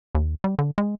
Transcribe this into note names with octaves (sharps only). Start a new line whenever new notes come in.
D#2
G3
D3
G#3